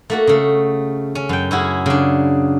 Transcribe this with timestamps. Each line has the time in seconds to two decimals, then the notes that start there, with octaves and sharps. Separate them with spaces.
0.10 A3 A#3 F#4
0.27 C#3 A3
1.15 C#4
1.29 F#2 G5
1.51 C#4 E4 F#4 G#4
1.86 C#3 D4